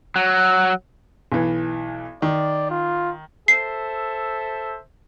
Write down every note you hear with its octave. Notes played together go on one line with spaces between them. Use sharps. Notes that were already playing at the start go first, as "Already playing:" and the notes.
F#3
B1 E3
D#3 D5
F4
A4 C5 E5 C7